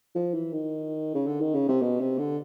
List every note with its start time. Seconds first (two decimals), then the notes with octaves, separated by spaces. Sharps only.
0.15 F3
0.34 E3
0.53 D#3
1.14 C#3
1.27 D3
1.41 D#3
1.54 C#3
1.68 C3
1.82 B2
2.01 C3
2.19 D3